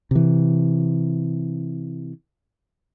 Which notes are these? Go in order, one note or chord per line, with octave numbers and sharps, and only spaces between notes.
C3 E3